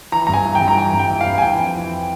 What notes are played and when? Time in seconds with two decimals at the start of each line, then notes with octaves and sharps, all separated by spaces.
0.12 E3 A#5
0.27 G2 A#5
0.34 G#5
0.45 E3
0.55 G5
0.61 G2
0.68 A#5
0.77 E3 G#5
0.93 G2
0.99 G5
1.09 E3
1.21 F5
1.26 G2
1.38 G#5
1.42 E3 G5
1.59 F2
1.75 E3